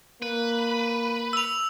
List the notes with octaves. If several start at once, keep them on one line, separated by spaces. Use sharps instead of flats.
A#3 B4
E6 F7